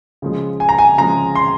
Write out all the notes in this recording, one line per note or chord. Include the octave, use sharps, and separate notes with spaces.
C#3 F3 G#3
G#5
A#5
G#5
C#3 F3 G#3 A#5
C6